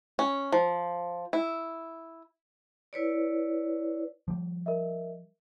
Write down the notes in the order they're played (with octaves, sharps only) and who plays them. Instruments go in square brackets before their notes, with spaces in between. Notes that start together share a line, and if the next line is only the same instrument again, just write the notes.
[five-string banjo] C#4
F3
E4
[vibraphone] E4 B4 C#5 D5
[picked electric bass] F3 G3
[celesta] A#4 D#5 E5